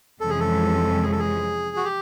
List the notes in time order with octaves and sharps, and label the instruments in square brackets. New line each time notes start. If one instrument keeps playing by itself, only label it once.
[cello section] F2 C3 E3 G#3 C#4 [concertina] A4
[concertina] G#4
A4
G#4
A4
G#4
F#4
G4